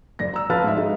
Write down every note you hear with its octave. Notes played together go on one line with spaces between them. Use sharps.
F#1 D5 A#6
A#5 E6
F3 B4 F5 A5 F6 A6
G#2 E5
G#3 D#4 E5